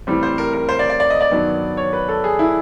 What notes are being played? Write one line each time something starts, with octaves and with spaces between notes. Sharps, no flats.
A2 E3 G3 C4
C5
A#4
A#4
C5
D5
D5
D5
D#5
D5
G2 D#3 F#3 B3
C#5
B4
A4
G#4
E4